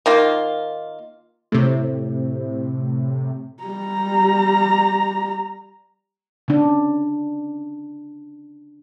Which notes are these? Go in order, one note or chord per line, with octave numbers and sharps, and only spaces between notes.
D#3 A#3 F4
A2 C3
G3 A#5
C#3 D4